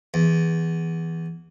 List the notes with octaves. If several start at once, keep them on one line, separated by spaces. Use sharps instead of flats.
E2